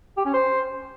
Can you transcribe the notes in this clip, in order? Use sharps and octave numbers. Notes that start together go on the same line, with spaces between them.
G4
C#4
C5